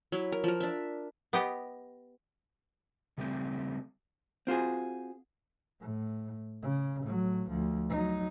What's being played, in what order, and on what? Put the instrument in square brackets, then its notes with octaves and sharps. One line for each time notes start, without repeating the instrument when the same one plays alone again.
[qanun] F#3 E4
A#4
F3 A#4
D4 E5
[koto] B3 G4 D#5
[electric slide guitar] C#3 G3 A3 C4
[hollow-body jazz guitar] C4 F4 F#4 G#4
[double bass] A2
C#3
A2 F#3
D2 F3
F#3 D#4